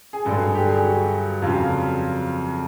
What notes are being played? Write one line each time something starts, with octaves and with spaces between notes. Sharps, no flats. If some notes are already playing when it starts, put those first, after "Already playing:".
G#4
G2 D3 F#3 A4
G#4
G4
G#4
F#4
F2 C#3 F#3 F4